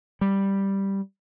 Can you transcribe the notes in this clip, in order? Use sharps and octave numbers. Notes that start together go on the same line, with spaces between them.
G3